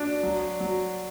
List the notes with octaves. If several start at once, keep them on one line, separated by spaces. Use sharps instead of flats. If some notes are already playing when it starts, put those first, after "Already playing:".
Already playing: D4 F#4
F#3
F#3